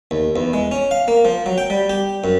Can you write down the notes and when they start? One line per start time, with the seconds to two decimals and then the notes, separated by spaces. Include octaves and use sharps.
0.11 D#2
0.36 E2
0.53 G#3
0.71 C#4
0.91 F5
1.08 A#3
1.25 F3
1.46 F#3
1.58 G5
1.70 G3
1.89 G4
2.24 F#2